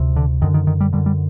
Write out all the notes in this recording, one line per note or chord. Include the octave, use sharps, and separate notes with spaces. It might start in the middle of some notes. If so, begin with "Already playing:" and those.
Already playing: D2 C3
D3
F#2 D3 D#3
D#3
D#3
G3
F#2 D3 G3
G3